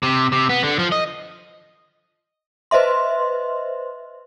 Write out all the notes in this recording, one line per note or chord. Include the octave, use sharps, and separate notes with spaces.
C3
C3
B3
D3
F3
D#5
B4 C5 D#5 E5 C6